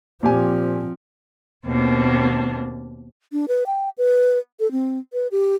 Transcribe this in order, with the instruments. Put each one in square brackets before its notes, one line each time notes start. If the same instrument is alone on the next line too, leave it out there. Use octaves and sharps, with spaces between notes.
[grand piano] A#2 G4 G#5 [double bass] F3 C4
[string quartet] D#2 B2 A#3 C4 D4
[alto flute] D4
B4
G5
B4
A4
C4
B4
G4